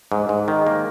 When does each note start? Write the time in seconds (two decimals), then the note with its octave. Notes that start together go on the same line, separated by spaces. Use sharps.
0.12 G#2
0.29 G#2
0.48 D#3
0.67 A#3